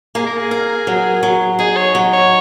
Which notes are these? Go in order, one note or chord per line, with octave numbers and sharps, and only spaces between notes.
A#3 G#4
A#4
G#4
A#4
F#3
F#3
D#4 G#4
C#5
F#3
C#5